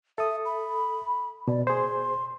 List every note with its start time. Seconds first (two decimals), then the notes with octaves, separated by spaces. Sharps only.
0.18 A4 E5 D#6
0.45 B5
1.48 B2 D5
1.67 G#4 C5 C6